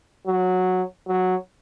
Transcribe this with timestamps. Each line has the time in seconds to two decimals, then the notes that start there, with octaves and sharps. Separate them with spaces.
0.27 F#3
1.08 F#3